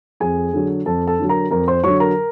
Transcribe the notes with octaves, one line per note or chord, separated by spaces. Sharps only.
F2 G#4 G#5
D3 F#3
F2 A4 A5
A4 A5
D3 F#3
A#4 A#5
F2 A#4 A#5
C5 C6
D3 F#3 C#5 C#6
A#4 A#5